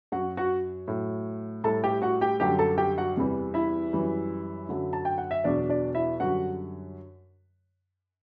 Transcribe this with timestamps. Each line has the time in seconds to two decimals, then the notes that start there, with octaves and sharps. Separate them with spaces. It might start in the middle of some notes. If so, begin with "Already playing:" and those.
0.12 F#2 F#3 F#4 F#5
0.37 F#4 F#5
0.88 A2 F#3
1.64 A2 G3 A4 A5
1.84 G4 G5
2.02 F#4 F#5
2.21 G4 G5
2.40 F#2 D3 G3 G4 G5
2.59 A4 A5
2.78 G4 G5
2.98 F#4 F#5
3.17 E2 C3 E3 G3
3.54 E4 E5
3.93 F#2 E3 G3
4.69 F#2 D3 F#3
4.93 A5
5.05 G5
5.18 F#5
5.31 E5
5.44 E2 B2 F#3 D4 D5
5.69 D4 D5
5.95 E4 E5
6.20 F#2 D3 G3 F#4 F#5